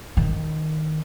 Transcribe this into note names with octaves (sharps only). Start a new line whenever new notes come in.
D#3